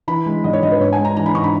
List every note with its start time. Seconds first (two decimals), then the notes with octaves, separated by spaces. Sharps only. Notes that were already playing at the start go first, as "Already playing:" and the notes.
0.08 E3 B5
0.26 G#3
0.44 G#1 D#5
0.53 C#5
0.63 G#1 D#5
0.72 B4
0.81 G#2 C#5
0.93 G#5
0.99 G#3
1.05 A#5
1.17 E3 A#5
1.26 B5
1.34 G#2 C#6
1.44 B5